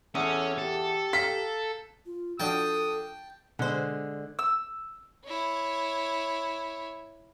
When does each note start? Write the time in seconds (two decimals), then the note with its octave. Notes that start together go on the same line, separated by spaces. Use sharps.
0.15 E2 C#4 A4
0.58 G4 A4
1.13 F5 A#5 B6
2.06 F4
2.40 F3 D4 F#4 A4 G5 A5 D#6
3.59 B2 D3 G#3 C5
4.39 E6
5.25 E4 C#5